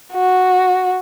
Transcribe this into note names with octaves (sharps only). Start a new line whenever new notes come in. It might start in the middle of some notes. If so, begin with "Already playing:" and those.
F#4